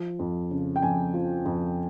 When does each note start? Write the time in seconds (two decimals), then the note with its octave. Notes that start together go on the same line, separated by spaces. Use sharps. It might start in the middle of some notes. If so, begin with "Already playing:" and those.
Already playing: F3
0.19 F2
0.51 C#3
0.76 G5
0.82 F2 G#5
1.14 F3
1.45 F2